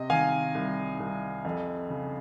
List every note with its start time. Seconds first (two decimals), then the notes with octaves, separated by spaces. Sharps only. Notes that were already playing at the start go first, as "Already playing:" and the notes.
Already playing: C3 D#5
0.10 D#3 F5 G#5
0.55 C2
1.00 C2
1.45 F2
1.90 C#3